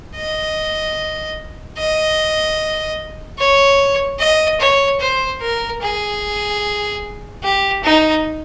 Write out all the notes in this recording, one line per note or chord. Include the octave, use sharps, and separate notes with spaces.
D#5
D#5
C#5
D#5
C#5
C5
A#4
G#4
G4
D#4